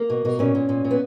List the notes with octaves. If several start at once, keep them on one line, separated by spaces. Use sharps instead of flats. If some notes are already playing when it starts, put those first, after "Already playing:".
Already playing: A#3
B2
B2
A#2 C#4
A#2
A#2
A#2
B3